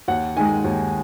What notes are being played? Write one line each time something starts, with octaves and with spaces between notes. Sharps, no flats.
D#2 F#5
D#3 G#3 G#5
D#2